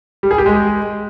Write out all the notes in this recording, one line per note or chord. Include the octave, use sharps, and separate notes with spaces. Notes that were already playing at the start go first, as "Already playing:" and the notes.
G3
G#4
G4
G#3